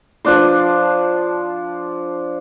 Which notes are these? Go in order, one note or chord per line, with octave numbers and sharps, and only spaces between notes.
F3 D4 D5 C6